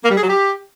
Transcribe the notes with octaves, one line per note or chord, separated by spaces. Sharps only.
A#3
G3
G#4
F#3
G4